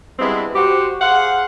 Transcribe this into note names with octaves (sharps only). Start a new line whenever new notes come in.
G3 G#3 B3 C4 D4 E4
F#4 G4 C5
G#4 C5 F5 F#5